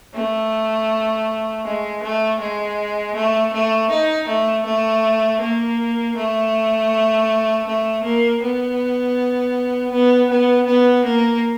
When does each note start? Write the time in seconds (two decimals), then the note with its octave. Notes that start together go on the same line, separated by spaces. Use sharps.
0.14 A3
1.64 G#3
2.02 A3
2.39 G#3
3.15 A3
3.53 A3
3.90 D#4
4.27 A3
4.65 A3
5.40 A#3
6.16 A3
7.66 A3
8.03 A#3
8.42 B3
9.92 B3
10.30 B3
10.66 B3
11.04 A#3